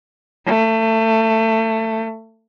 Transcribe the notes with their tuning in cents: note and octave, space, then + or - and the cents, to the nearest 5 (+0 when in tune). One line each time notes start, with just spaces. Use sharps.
A3 +25